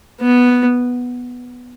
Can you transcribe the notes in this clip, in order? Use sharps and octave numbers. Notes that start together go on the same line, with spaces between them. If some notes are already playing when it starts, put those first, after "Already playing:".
B3